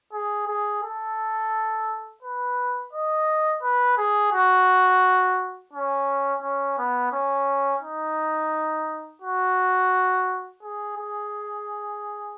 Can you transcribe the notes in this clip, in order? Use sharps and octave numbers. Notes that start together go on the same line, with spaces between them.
G#4
G#4
A4
B4
D#5
B4
G#4
F#4
C#4
C#4
B3
C#4
D#4
F#4
G#4
G#4